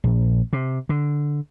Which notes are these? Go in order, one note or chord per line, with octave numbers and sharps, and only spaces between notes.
A#1
C3
D3